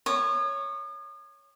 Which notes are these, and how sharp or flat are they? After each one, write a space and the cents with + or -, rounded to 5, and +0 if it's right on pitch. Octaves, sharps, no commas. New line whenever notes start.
C#5 +0 D#6 -40